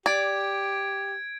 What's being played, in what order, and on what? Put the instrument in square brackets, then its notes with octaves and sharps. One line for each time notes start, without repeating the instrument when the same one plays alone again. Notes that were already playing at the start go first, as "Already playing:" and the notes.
[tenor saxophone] G4 [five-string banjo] D5 [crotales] G#6 D7